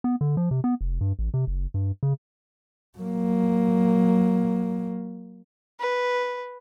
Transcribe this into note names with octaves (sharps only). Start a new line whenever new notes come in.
B3
D3
F3
C3
B3
F1
G2
A1
C3
F#1
G2
C#3
F#3 A#3
B4